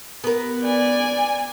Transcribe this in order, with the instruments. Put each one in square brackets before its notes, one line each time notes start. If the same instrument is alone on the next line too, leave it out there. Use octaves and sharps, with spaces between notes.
[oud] B3 A#4
[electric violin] D5 G#5